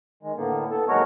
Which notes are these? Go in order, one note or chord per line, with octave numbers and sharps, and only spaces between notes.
D#3 G#3
A2 D3 A#3 B3
B3 A4
D#2 F#3 G#3 F#4 A#4 C#5